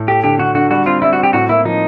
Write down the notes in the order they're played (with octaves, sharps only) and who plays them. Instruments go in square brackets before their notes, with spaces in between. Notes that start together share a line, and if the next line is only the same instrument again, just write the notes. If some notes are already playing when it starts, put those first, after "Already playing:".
Already playing: [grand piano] A2
[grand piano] A3 [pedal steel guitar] G4
[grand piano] D3 [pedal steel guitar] G4
[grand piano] D3 [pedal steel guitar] F#4
[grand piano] D3 [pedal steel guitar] F#4
[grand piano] G3 [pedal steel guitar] F#4
[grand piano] C4 [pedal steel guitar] F4
[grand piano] G3 [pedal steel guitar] E4
[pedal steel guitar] F#4
[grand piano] C4
[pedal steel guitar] G4
[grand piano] A2 [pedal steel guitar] F#4
[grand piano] A#3 [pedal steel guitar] E4
[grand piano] F3 [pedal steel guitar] D#4